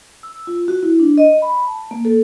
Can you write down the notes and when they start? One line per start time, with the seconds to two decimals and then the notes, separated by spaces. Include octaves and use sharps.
0.23 E6
0.47 F4
0.68 F#4
0.83 E4
1.00 D4
1.18 D#5
1.42 B5
1.67 A5
1.91 A#3
2.05 A4